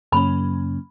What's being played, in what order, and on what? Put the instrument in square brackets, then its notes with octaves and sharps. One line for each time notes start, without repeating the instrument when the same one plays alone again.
[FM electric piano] F#2 C#3 F#3 A#3 C#4 [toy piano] B5